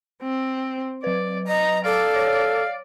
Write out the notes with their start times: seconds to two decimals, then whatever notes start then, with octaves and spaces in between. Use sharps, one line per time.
0.22 C4
1.04 F#3 B4 D5
1.48 D#5 A#5
1.85 A4 D5 F5
2.16 C#5